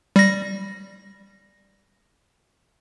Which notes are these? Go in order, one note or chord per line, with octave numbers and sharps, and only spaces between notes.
G3 A#6